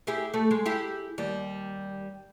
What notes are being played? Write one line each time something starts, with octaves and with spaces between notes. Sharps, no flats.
E4 G4 G#4
A3
G#3
E4 G4 G#4
D#2 G3